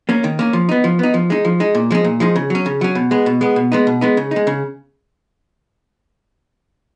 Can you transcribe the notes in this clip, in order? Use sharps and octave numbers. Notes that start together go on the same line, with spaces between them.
A#3 C#4
D#3
A#3 C#4
F3
B3 D#4
F3
B3 D#4
F3
G#3 D#4
F3
G#3 D#4
A#2
F3 G#3 D#4
A#2
F3 G#3 D#4
C#3
F#3 C#4
C#3
F#3 C#4
B2
G#3 B3
B2
G#3 B3
B2
G#3 B3 D#4
B2
G#3 B3 D#4
C#3
G#3 D#4
C#3